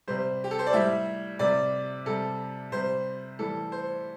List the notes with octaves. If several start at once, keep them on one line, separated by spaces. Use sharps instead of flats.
C3 G3 C5
G4
A4
C5
D5
A2 G3 E5
C3 G3 D5
C3 G3 A4
C3 G3 C5
A2 E3 G3 A4
C5